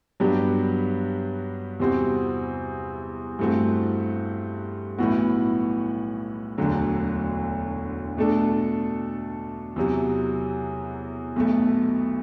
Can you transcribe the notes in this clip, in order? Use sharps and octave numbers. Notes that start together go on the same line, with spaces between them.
G2 F#3 B3 D4 G4
E2 C3 G3 C4 F#4
G2 E3 A3 C4 F#4
B1 A2 E3 B3 F#4
E1 D2 D3 F#3
B2 A3 D4 A4
E2 C3 F#3
B1 B2 A3